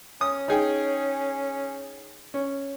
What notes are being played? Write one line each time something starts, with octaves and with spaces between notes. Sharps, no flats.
C#4 D#6
D#4 G#4 G5
C#4